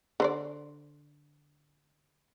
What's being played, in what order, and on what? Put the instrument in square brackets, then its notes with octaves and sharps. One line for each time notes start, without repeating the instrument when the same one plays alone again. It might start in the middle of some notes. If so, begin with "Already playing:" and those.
[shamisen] D3 C5 D5